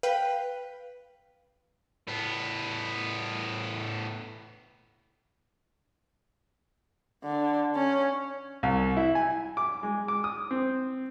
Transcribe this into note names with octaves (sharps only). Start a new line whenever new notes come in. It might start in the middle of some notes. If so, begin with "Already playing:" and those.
B4 F5 G5
A2 B3
D3
C#4
C2
E4
G#5
D6
G#3
D6
D#6
C4